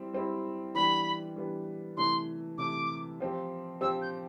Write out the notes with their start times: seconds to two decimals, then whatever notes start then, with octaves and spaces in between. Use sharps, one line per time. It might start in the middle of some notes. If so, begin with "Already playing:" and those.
Already playing: G3 C4 E4
0.13 G3 C4 E4
0.75 E3 G3 B3 D4 B5
1.36 E3 G3 B3 D4
1.97 C3 E3 A3 C6
2.58 C3 E3 A3 D6
3.20 F3 C4 G4
3.81 F3 C4 G4 E6
4.02 G6